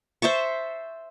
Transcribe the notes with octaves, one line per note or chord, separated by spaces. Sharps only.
C5 E5 A5 C#6